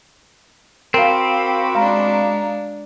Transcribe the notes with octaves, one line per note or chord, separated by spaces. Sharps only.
C4 F#4 A#4 F5 B5 D6
G#3 D4 F5 A#5